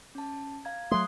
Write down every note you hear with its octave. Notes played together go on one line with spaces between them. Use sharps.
C#4 A5
F5 A#5 G#6
F#3 A3 C6 D#6 F#6